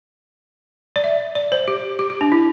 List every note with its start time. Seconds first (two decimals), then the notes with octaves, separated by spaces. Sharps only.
0.96 D5
1.04 E5
1.35 D5
1.52 C5
1.68 G4
1.99 G4
2.10 G4
2.21 D4
2.32 E4